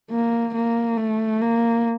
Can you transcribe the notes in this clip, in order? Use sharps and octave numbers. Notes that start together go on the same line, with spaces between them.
A#3
A#3
A3
A#3